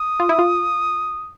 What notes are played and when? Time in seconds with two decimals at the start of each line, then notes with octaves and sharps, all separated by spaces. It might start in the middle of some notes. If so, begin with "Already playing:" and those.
Already playing: D#6
0.20 F4
0.29 E4
0.39 F4